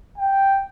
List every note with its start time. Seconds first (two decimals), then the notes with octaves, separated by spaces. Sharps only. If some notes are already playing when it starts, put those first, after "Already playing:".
0.18 G5